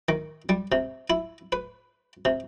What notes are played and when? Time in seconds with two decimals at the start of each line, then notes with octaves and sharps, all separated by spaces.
0.09 D#3
0.49 G3
0.72 C3
1.10 E4
1.52 B4
2.25 C3